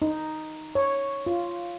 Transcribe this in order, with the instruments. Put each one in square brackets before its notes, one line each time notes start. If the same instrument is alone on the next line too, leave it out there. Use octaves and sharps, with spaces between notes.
[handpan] D#4
C#5
F4